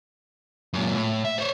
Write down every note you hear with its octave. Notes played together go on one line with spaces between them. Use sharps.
F#2 A#2
A2
E5
C5 C#5